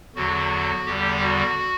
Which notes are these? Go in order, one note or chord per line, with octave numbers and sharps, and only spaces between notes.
E2 D3 F#3 F#4
E2 D3 G3 G4
F#4